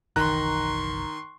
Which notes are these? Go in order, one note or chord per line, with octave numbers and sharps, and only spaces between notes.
F#1 B1 D#3 E3 A#5 C6 C#6 F#6